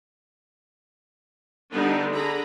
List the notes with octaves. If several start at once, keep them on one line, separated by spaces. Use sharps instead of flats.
D3 G3 B3 D4 D#4
D3 G#4 A#5 B5